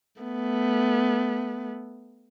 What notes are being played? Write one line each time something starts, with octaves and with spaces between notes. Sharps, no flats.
A3 B3